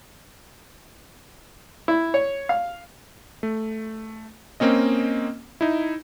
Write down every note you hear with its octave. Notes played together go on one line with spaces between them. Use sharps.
E4
C#5
F5
A3
A#3 C4 C#4 D#5
D#4 E4